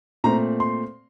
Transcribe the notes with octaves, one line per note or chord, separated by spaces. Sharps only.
A#2 A3 C4 A#5
C6